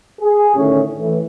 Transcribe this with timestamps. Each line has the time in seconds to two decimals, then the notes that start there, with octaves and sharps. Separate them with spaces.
0.21 G#4
0.56 A2 D3 D#3 C#4
0.98 A2 E3